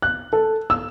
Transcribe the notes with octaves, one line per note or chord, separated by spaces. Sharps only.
F#6
A4
E6